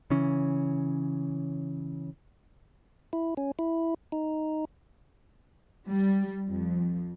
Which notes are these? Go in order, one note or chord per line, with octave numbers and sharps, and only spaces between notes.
C#3 E3 C#4
E4
C#4
E4
D#4
G3
F2